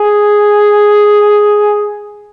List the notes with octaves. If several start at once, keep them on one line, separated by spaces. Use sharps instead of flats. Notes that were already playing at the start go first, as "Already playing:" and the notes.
Already playing: G#4